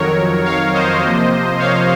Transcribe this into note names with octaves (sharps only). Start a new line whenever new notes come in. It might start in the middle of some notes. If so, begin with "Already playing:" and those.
Already playing: F2 D#3 F#3 A#4 C#5
C#5 F5
C5 D#5
C3 F3 A#3
C#5 F5